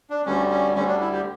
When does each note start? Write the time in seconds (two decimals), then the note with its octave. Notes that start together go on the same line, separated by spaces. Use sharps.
0.10 D4
0.26 D2 D3 G3 C#4
0.50 C#4
0.75 D2 D3 G3 C#4
0.88 D4
1.00 E4
1.13 G4